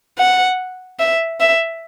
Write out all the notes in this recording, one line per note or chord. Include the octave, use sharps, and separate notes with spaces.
F#5
E5
E5